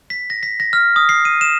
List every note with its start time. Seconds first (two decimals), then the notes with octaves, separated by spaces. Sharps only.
0.10 B6
0.30 A#6
0.43 B6
0.60 A#6
0.73 F6
0.96 D#6
1.09 C7
1.25 D#7
1.41 E7